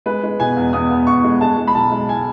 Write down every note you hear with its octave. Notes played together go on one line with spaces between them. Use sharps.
G#3 B4
G#3
B2 G#5
E2
E2 D#6
B3
E2 C#6
G#3
G#3 A5
G#3
B5
B1 A5
G#3
G#5